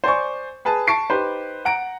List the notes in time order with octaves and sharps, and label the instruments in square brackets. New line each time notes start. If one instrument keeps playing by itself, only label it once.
[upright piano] C5 D5 G#5 C#6
G#4 B4 A5
A5 C#6 C7 D7
D#4 G4 B4 C5
F#5 A#5 D7